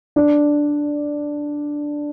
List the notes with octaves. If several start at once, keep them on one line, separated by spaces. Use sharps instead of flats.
D4